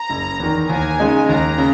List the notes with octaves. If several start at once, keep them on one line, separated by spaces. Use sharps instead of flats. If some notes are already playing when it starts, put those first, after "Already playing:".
Already playing: A#5
F#1
E2 D#3
D#2 G#5
C#3 G#3 D#4
D#2 A#5
C#3